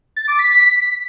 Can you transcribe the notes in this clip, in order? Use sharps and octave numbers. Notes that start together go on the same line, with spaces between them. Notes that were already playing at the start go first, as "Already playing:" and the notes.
A6
D6
B6